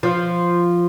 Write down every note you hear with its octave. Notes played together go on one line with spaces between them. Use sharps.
F3